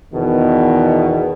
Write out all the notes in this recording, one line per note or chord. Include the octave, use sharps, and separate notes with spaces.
E2 B2 D#3